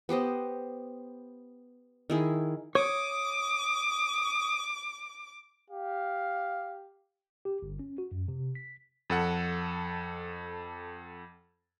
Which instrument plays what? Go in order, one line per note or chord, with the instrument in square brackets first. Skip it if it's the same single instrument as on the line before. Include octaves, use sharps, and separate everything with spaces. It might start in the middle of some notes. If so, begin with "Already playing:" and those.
[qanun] B3 G4 C5 D#5
D#3 E4 G#4
[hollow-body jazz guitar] C#5 [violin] D6 [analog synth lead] D#6
[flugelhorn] G4 [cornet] F5
[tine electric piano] G4
G1
C#4
F#4
F#2
C3
B6
[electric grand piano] F2 A4 F#5